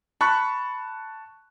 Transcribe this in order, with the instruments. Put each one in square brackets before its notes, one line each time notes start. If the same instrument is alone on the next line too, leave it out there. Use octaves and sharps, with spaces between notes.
[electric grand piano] A5 C#6 F#6 [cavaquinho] B5